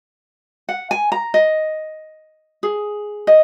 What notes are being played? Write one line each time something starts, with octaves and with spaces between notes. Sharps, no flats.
F#5
G#5
A#5
D#5
G#4
D#5